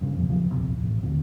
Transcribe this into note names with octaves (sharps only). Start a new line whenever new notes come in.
G2 C#3
F2 B2
D2 C#3 F3 F#3
D#1 B1 F2 C3
A1
D#2 D3 D#3 C4